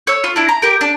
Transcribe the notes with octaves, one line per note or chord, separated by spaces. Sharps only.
C#5 E6
F4
D4 E4
A#5
G4 A#4
D4